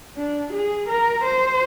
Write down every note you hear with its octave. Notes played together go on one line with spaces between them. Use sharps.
D4
G#4
A#4
C5